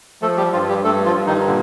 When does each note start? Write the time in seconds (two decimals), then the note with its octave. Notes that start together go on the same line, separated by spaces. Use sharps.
0.22 F3 A3 A4
0.37 G3 G4
0.53 G2 F3 F4
0.69 G3 G4
0.84 G2 A3 A4
1.05 F3 F4
1.16 G2
1.27 D#3 D#4
1.47 A#2 D3